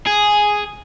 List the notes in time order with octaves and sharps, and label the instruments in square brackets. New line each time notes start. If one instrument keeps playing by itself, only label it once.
[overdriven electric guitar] G#4